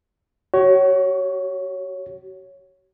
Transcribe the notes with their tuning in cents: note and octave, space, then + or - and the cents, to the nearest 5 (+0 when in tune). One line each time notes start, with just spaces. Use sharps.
F#4 +40 C#5 +0